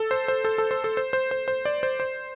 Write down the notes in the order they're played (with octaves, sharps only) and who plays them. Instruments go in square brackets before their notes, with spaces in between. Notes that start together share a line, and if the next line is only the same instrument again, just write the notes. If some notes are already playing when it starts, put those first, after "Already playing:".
Already playing: [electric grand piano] A4
C5
C5
A4
A4
C5
A4
C5
C5
C5
C5
D5
C5
C5